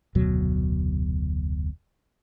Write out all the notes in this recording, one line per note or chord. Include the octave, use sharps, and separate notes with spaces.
F1 D2 B2 F#3